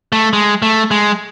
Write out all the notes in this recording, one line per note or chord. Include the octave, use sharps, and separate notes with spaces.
A3
G#3
A3
G#3